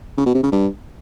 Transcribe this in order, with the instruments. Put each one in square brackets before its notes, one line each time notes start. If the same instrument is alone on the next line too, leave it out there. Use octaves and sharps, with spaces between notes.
[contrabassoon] C#3
B2
C3
C#3
G2